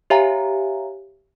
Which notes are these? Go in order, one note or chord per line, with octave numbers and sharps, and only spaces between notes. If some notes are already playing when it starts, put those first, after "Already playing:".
G4 C#5 E5 F5 G#5 A#5